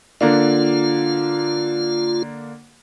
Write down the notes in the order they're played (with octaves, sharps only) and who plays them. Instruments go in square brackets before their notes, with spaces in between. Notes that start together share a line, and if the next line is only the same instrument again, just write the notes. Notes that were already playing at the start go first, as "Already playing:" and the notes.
[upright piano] D3 A#3 D4 [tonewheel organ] F4